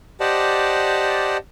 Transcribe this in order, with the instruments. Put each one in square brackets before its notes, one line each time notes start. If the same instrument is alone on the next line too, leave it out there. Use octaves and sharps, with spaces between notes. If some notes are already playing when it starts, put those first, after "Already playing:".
[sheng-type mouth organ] G4 C5 D5 D#5 F#5 A5